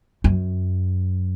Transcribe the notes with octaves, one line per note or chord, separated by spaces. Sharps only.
F#2